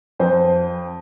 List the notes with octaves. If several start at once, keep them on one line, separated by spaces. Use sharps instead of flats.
F2 C5